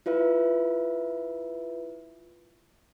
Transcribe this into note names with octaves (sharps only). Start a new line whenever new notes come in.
E4 F4 B4 E5